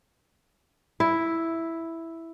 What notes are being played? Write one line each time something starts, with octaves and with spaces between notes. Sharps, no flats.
E4